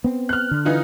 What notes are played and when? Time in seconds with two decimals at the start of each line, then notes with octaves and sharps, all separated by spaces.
0.04 B3 C4
0.29 F6 F#6
0.51 D3
0.65 E3 D#4 F4